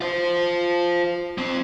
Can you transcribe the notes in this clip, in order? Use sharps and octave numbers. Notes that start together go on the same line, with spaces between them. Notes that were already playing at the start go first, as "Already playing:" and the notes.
F4 C5
F3 C4